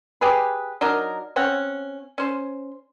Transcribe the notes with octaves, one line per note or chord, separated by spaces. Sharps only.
G4 G#4 B4
F#3 D4 D#4 A#4
C4 C#4 F#5
C#4 C5